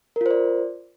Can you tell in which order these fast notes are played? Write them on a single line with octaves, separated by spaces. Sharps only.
A#4 F4 C5 D5